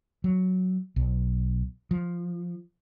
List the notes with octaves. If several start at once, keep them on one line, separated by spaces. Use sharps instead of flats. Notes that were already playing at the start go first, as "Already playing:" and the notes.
F#3
B1
F3